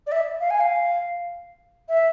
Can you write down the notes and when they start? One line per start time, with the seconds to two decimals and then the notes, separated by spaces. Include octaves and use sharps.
0.07 D5
0.12 E5
0.41 F5
0.50 G#5
0.60 F5
1.89 E5